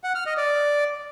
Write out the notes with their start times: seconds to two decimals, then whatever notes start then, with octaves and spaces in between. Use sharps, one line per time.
0.04 F#5
0.15 F6
0.26 D#5
0.37 D5